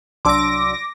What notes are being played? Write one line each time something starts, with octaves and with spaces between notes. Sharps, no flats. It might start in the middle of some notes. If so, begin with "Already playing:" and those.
C2 F#3 D4 C6 D6 E6 A#6